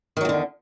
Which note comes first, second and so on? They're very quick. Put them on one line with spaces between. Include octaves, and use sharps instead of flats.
D#3 F#3 E2 D3